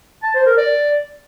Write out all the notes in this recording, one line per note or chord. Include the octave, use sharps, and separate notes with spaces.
A5
C5
A#4
D5